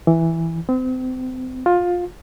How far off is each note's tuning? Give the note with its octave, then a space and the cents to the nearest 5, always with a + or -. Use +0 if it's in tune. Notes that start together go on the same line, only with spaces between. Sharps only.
E3 +0
C4 -35
F4 +20